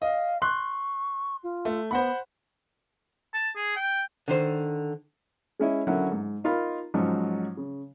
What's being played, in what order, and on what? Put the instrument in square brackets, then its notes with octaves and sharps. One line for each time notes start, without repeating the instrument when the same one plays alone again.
[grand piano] D#5 [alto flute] F5
[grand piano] C6 F#6 [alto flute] C#6
[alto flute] F4
[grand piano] A3
[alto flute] B3 [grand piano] C5 F#5 B5
[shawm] A5
G#4
G5
[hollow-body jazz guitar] D3 D#3 C5
[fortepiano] G#3 C#4 E4 D#5
D3 F#3 C#4 E4 A#4 F#5
G#2
D#4 F4 A#4 F5 B5
G#2 F3 F#3 C#4 D#4
C#3